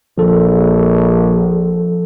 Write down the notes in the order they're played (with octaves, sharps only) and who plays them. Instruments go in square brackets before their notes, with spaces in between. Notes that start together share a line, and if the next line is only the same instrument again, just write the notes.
[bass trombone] A#1 [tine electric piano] F3 A4